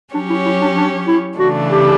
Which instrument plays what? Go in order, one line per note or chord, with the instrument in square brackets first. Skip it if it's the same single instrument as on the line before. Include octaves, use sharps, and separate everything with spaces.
[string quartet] F#3 C#4 G4 C#5 [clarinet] D4
[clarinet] E4
E4
D4
D4
E4
[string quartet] C#3 E3 A3 D4 [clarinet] F#4
[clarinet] G4